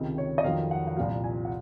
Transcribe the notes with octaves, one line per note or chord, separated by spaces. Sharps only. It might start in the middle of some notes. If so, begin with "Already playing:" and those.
Already playing: C#2 C3 D#3
C#5
D#5
F1 F2 D#3 F#3 F5
F#5
F#5
C2 A#2 F3 F5
G#5
F#5